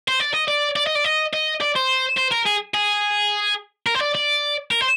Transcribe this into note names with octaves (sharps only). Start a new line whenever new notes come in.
C5
D5
D#5
D5
D5
D#5
D5
D#5
D#5
D5
C5
C5
A#4
G#4
G#4
A#4
C5
D5
D5
A#4
C5